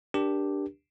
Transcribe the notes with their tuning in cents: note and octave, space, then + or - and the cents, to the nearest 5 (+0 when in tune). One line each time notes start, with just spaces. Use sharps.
D4 +0 G4 +0 A#4 +20